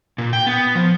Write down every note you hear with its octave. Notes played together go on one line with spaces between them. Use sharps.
A#2
G5
B3
F3